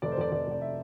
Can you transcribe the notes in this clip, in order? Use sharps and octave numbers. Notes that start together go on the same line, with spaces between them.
F1 D5
C5
F1 D5
F1 D5
F1 D5
E5